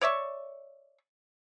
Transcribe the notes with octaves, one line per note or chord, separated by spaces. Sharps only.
C#5 D5 E5 C#6